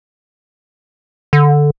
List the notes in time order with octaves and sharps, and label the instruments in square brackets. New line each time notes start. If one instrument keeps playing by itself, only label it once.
[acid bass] D3